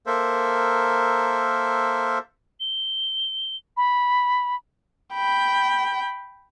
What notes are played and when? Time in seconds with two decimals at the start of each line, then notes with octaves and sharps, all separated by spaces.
0.07 A#3 A4 A#4 C5 E5
2.60 G7
3.77 B5
5.14 G5 B5